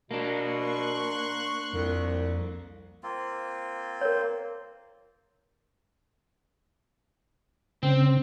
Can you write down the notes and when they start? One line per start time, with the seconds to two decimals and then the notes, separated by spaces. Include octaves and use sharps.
0.11 B2 A#3 D4
0.62 C6 C#6 F#6
1.73 C2 F2
3.03 A#3 C4 F4
4.01 A#4 C#5
7.83 C#3 C4